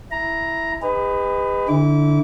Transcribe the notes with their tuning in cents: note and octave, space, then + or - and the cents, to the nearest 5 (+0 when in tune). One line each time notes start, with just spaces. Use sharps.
E4 +0 A#5 +5
D#4 +0 G#4 -45 B4 +20
D3 +0 E4 -25 D6 -30